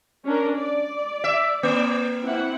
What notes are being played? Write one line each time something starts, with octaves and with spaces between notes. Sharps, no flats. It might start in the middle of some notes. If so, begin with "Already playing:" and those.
C#4 D4 A#4
D5
E5
A#3
C4 E4 F#5